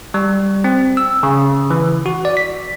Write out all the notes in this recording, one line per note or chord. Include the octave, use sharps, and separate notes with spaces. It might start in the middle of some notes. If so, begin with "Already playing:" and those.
G3
C4
E6
C#3
E3
F#4
D5
B6